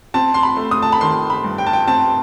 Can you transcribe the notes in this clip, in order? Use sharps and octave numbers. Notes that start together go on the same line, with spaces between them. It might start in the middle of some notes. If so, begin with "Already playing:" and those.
C4 A5
C6
B5
A3
D#6
A5
B5
D#3 C6
B5
G2
G5
A5
G5
C4 A5